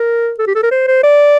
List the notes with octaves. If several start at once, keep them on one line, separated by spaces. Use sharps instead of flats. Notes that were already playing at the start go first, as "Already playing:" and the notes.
Already playing: A#4
A4
G4
A4
A#4
C5
C5
D5